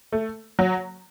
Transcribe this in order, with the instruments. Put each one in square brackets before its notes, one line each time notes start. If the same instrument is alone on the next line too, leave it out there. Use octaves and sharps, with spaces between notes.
[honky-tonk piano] A3
F#3